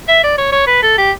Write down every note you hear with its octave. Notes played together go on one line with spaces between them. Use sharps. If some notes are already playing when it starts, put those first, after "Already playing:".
E5
D5
C#5
C#5
B4
A4
G4